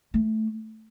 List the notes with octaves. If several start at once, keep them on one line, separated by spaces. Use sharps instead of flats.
A3